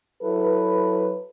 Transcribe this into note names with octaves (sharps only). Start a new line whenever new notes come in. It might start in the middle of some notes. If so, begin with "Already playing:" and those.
F#3 E4 A4 B4